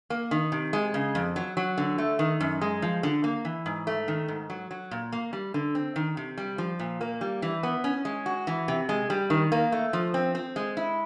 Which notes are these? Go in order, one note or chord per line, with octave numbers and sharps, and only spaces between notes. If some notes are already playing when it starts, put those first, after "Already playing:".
A#3
D#3
C3
G#3
C#3
F2
F#3
F#3
D3
A3
D#3
F#2
G#3
F3
D3
A#3
E3
G#2
A3
D#3
G#2
F#3
F#3
A#2
A#3
G3
D3
C4
D#3
C3
G3
F3
A#2
A#3
G3
E3
B3
C#4
G#3
F#4
E3
C3
G#3
G3
D#3
A#3
A3
F3
C4
C4
G#3
E4